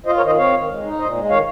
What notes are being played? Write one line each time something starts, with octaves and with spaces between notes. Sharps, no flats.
F4 C5 D#5
A#4 C#5
D#3
C5 D#5
C4 C#5 F5
D#3
G#3
D#4
A#2 C5 D#5
G#3
D#3 C#5 F5